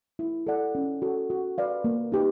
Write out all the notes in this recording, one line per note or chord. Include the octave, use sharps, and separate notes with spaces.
E4
A4 D5 F#5
C#4
F#4 A4
F#4
B4 D5 F5
A#3
D#4 G4 B4